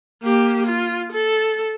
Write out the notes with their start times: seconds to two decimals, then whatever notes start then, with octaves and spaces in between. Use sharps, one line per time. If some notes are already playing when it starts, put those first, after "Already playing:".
0.23 A#3 G4
0.66 F4
1.12 A4